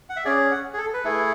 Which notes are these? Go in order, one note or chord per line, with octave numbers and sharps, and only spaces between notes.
F#5
E5
C#4 G#4 D5
F#5
G#4
A4
B4
A3 E4 G#4 A4